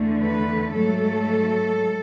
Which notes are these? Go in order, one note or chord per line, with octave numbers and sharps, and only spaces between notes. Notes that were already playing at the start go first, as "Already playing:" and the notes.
Already playing: E2 D3 A3
B4
G#2 F#3 A3 A4